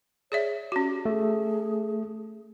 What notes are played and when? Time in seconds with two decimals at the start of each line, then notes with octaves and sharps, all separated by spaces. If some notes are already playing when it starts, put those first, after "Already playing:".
0.32 G#4 C#5 D5 E5
0.72 C#4 F#4 G4
1.05 A3 G#4